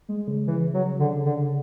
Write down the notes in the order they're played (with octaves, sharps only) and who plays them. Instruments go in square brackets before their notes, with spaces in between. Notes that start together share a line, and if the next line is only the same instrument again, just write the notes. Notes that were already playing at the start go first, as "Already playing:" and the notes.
[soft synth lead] G#3
C#3
[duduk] E3
F#3
D3
D3